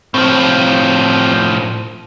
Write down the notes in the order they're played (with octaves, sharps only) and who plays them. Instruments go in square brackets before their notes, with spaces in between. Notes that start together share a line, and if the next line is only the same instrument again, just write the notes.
[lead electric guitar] A2 F3 [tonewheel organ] C4 G6